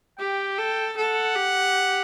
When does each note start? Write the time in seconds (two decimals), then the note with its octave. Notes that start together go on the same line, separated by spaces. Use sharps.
0.19 G4 G5
0.58 A4
0.96 A4 F#5
1.36 G4